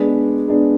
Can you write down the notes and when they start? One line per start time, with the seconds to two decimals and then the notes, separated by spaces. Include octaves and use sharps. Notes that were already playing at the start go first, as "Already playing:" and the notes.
Already playing: G#3 B3 D4
0.48 G#3 B3 D4